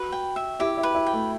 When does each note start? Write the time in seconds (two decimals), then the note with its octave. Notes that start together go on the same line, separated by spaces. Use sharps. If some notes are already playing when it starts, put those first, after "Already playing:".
Already playing: F#4 B4
0.12 G5
0.36 E5
0.60 E4 G4
0.77 E4
0.83 B4
0.95 E4
1.06 G5
1.13 A3